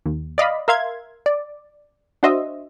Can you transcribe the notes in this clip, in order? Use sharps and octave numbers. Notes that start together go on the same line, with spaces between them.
D#2
D5 D#5 F5 B5
A#4 E5 F5 C6 G#6
D5
D4 F#4 C5 D#5 E5